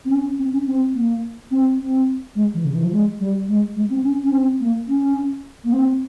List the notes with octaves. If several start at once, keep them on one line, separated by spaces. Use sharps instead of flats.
C4
C#4
C4
C#4
C4
A#3
C4
C4
G#3
E3
C#3
E3
F3
G#3
G3
G#3
G#3
C4
C#4
C#4
C4
A#3
C#4
A#3
C4